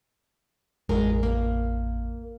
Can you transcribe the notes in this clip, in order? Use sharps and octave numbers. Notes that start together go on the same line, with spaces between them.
A1 F2 G#3 A#4
A#3